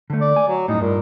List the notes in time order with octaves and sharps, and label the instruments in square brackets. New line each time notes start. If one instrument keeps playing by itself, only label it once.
[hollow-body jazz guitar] D3 A3
[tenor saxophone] D5
[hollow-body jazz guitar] G#5
[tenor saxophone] F#3
[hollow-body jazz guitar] F#2 A2 [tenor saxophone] D#4
[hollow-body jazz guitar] G2 [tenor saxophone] A#2